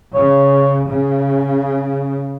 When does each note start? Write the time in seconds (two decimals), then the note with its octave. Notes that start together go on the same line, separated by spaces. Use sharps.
0.14 C#3 C#5
0.88 C#3